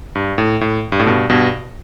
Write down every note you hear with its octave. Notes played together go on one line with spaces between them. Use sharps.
G2
A2
A2
G2
A2
G2 B2
G2 B2